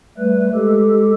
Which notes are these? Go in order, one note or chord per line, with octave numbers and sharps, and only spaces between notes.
G3 A3 B4
G#3 G4 A4